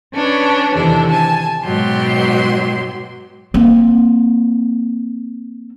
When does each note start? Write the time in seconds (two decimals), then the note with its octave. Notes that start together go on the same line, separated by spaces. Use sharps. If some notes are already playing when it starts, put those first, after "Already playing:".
0.14 C#4 D4 B4 C#5
0.75 E2 C3 D#3 D4 A4
1.11 G#5 A5
1.64 G#2 B2 F#3 G4 C6
3.54 A#3 C4